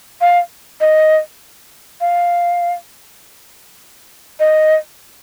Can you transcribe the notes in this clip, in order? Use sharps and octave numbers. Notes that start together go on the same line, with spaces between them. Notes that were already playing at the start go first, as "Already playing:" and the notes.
F5
D#5
F5
D#5